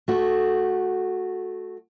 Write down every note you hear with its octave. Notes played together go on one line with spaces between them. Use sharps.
A3 F#4